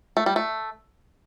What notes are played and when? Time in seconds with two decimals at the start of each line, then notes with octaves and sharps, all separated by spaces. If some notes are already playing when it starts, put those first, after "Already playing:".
0.17 A3
0.26 G3
0.36 A3